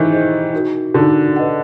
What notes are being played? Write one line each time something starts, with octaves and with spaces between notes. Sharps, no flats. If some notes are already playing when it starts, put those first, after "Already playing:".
Already playing: D#3 E3 G#4 C5 D#5
G#4 C5 D#5
D#4 F#4 A#4
D3 D#4 F#4 A#4
B4 D#5 F#5